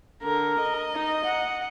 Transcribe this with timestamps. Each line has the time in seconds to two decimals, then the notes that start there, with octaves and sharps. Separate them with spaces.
0.23 D3 A#4
0.61 D#5
0.94 D#4
1.25 F#5